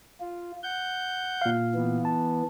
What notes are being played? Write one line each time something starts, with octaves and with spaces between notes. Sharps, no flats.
F4
F#5 G6
A#2 F5
E3 B3
A5